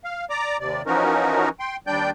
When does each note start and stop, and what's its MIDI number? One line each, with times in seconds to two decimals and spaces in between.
0.04 0.25 77
0.30 0.57 74
0.30 0.57 82
0.30 0.57 86
0.60 0.82 39
0.60 0.82 48
0.60 0.82 74
0.86 1.49 52
0.86 1.49 53
0.86 1.49 61
0.86 1.49 63
0.86 1.49 66
0.86 1.49 70
1.60 1.76 79
1.60 1.76 84
1.87 2.10 39
1.87 2.10 55
1.87 2.10 62
1.87 2.10 74
1.87 2.10 79
1.87 2.10 91